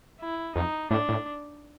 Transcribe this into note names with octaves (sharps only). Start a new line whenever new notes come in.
E4
F2 D#4
A2 D4
A2